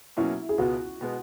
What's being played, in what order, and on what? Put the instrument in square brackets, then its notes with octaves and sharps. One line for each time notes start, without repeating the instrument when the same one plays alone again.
[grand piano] B2 F#3 A#3 C#4 F#4 [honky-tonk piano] E4
[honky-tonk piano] G#4
[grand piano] C#2 B2 G#3 B3 [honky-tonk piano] F#4
[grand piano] B2 G#3 B3